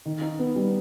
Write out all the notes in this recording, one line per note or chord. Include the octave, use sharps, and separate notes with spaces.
D#3
D#4
B3
G3